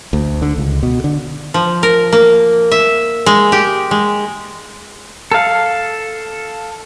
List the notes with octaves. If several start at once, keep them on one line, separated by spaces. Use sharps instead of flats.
D2
D3
C#2
B2
D3
F3
A#4
A#3
E5
G#3
G4
G#3
A4 F5